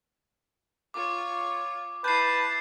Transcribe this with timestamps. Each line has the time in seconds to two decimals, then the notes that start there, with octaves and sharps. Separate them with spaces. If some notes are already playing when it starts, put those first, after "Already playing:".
0.94 F4 C#5 D6
2.04 E4 B4 A5 G6 C7